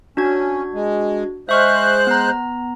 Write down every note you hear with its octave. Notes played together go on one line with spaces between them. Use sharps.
C#4 D4 F#4 G#6
G#3
G#3 C5 E5 C#6 F6 F#6
B3 A#5